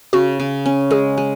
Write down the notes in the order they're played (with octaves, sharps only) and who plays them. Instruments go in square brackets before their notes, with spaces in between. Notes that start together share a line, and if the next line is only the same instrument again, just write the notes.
[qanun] C#3 [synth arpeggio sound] F#4
[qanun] C#3
C#4
[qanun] G#3 [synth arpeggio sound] G#4
[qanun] G#3